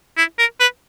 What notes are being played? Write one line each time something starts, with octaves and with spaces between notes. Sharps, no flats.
E4
A#4
B4